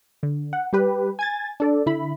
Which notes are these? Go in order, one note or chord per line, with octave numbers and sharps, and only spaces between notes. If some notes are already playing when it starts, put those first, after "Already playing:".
D3
F#5
G3 G4 B4
G#5 G#6 A6
D4 A4 D5
D3 E4 B5